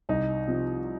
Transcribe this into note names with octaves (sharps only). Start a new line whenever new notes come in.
C2 D#4
C3 F3